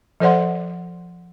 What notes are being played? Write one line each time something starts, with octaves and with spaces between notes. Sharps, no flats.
F3 A4 C5 D5 F#5 C6